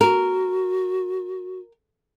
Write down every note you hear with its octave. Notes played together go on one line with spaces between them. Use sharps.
F#4 A#4